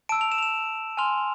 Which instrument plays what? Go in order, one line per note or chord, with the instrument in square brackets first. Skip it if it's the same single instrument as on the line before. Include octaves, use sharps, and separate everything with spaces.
[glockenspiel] A5 E6 D7
F7
E7
F7
E7
G#5 C6 F6 F7